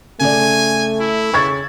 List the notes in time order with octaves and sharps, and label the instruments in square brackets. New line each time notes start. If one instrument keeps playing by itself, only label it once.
[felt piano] C#3 D5 [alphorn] A3 [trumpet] G#5
[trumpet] E4
[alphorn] C#3 [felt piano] C#6 G#6 A6